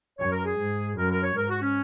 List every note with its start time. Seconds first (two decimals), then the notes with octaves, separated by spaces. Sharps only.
0.19 F#2 C#5
0.33 A#4
0.45 G#4
0.58 G#2
0.97 F#2 A#4
1.10 A#4
1.24 C#5
1.36 G#2 A#4
1.49 F#4
1.62 C#4